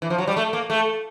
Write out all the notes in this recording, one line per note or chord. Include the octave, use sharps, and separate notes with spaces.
E3
F3
F#3
G3
A3
A#3
A3